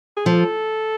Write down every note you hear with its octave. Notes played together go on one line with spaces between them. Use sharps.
G#4
F3 A4